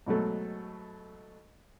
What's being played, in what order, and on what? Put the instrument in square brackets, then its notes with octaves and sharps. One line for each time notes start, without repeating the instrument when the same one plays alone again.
[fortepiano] G#2 B2 F#3 A3